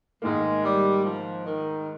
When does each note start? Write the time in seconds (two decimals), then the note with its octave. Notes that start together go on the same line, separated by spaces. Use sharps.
0.22 G#2 D#3 G#3 A#3
0.63 G3
1.04 F3
1.45 D#3